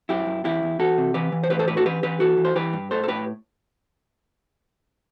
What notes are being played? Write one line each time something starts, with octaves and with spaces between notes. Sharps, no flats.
F#2 E4 G4
F#2
E2 E4 G4
E2
E2 F#4 A4
C3
E3 G4 B4
E3
C5
A2 G4 B4
A4 C5
A2 G4 B4
F#4 A4
E3 G4 B4
E3 G4 B4
E3 F#4 A4
E3
C5
E3 G4 B4
G2
A2 A4 C5
A4
A2 G4 B4